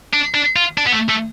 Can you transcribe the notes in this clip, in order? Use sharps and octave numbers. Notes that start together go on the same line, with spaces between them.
D4
D4
F4
D4
B3
A3
A3